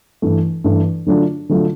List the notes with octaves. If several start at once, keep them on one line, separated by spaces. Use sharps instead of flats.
G2 E3 A3
G2 E3 A3
D3 F#3 A3 D4 F4
D3 F#3 A3 D4 F4